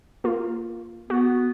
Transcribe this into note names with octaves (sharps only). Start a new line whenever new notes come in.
A#3 F4
B3 F#4